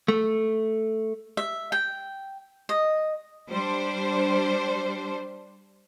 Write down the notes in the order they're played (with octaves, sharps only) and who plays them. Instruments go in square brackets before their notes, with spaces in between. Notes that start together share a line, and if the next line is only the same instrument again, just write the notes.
[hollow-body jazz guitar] A3
[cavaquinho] E5
G5
D#5
[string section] G3 D4 C5